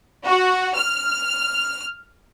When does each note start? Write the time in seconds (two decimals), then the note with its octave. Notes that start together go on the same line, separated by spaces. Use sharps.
0.25 F#4
0.76 F6